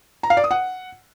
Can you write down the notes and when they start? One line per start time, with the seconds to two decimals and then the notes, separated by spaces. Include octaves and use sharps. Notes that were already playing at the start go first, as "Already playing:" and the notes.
0.23 A#5
0.30 F5
0.37 D5
0.44 D#6
0.51 F#5